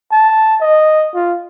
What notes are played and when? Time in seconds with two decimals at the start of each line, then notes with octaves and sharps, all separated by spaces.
0.12 A5
0.61 D#5
1.14 F4